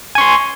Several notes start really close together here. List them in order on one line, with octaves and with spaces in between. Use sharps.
G#5 C#6 C6